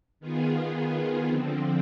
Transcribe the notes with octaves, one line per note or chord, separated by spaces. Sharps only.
D#3 B3 F4 G#4
D3 F3 C4